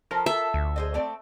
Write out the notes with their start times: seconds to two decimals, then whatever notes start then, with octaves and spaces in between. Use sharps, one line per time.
0.11 F3 A4 A#4 C5
0.26 F4 A4 E5
0.54 D2
0.76 G#4 C5 D#5
0.94 A3 C4 D5